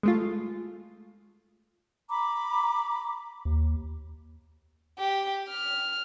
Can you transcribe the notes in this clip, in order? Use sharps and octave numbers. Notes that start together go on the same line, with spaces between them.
G#3 A3 F4
A#5 B5 D6
D#2
G4
F6